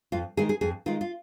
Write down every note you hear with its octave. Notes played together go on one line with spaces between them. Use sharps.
F2 F4
D#3 G#3 G#4
G#4
F2 G#4
D#3 G#3 F4
F4